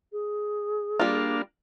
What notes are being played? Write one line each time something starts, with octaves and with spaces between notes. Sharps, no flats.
G#4
G3 A#3 D4 F4 F5